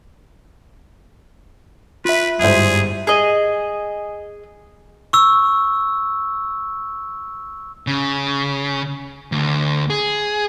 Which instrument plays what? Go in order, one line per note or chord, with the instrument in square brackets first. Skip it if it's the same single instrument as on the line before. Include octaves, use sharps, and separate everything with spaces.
[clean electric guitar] F4 E5 [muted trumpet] B4
[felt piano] G1 E4 C5 [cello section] G#2 G3 [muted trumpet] G#4
[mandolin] G#4 D#5
[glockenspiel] C#6 E6
[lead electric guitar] C#3
D2
G#4